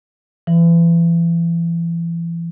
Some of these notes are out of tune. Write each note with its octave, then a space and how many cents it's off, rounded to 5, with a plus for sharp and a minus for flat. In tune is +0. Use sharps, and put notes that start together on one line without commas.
E3 +35